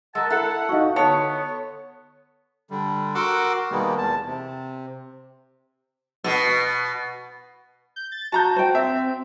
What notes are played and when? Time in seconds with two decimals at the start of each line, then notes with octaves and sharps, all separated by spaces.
0.15 G#3 A#4 F#5 A5 A#5 E6
0.30 E4 A4 F#5
0.69 D#4 F#4 F5 C#6
0.96 D3 B3 C#5 A5 C#6 D#6
2.71 D3 G3
3.15 F#4 A#4 F#5 C6 D6 E6
3.71 B2 D#3 G3 G#3 A#3 B3
3.98 E2 A5
4.26 C3
6.24 B2
7.96 G6
8.12 A6
8.32 F#4 A5 A#5 G6
8.56 C5 G5
8.75 C4 E5